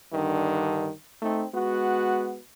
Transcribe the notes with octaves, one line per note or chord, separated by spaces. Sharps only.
G2 D3 D#3
A3 C4 D#4
G#3 B3 F#4